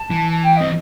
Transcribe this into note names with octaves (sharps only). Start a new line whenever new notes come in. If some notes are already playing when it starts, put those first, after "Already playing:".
Already playing: A5
E3
A5
G5
C4 D#5